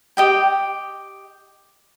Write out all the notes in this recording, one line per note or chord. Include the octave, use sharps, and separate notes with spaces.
G4 D#5 G5